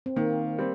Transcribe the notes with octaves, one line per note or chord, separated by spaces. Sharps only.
C4
D#3 A#3
G3 C4